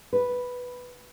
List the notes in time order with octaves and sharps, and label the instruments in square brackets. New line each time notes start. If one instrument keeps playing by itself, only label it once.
[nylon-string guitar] B4